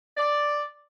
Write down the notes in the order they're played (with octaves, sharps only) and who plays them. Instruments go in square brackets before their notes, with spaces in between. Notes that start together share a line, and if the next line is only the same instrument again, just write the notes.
[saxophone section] D5